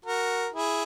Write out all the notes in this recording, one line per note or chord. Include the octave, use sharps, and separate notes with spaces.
F#4 A#4
E4 G#4